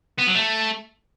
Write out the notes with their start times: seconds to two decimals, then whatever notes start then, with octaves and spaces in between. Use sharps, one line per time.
0.19 B3
0.27 F#3
0.35 A3